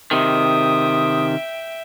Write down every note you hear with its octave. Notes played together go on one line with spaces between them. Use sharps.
C3 D#3 E5 G5 D#6